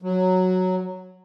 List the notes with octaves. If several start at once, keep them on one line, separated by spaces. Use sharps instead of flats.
F#3